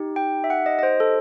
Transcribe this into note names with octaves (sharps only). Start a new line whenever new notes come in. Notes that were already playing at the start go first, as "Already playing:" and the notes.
Already playing: D#4 G4
G5
E5
F#5
D#5
D#5
C5
A4